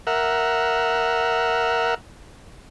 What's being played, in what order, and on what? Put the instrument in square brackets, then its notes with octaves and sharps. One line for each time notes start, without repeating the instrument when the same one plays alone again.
[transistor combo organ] A#4 E5 F#5